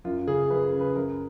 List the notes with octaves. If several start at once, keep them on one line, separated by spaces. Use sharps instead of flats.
F#2 F4
C#3 G#4
F#2 B4
C#3
B4
F#2 A#4